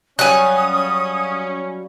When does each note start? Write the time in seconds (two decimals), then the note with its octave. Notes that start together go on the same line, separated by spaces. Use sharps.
0.19 F#3 G3 C#4 F5 G#5 D#6 F#6